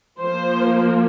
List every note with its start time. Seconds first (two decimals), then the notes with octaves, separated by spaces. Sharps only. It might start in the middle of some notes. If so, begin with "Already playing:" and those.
0.20 F3 A#3 C5